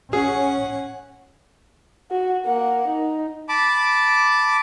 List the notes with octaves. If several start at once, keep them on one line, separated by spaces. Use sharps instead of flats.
C#4 G#4 F#5
F#4
A#3 F#5
D#4
A5 B5 D6